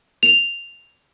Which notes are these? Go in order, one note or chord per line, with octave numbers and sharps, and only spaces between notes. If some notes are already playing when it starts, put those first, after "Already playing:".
F7